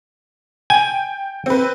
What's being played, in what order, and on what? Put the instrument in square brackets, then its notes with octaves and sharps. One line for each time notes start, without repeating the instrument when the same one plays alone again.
[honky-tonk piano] G5 [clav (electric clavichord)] G#5
[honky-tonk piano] C4 B4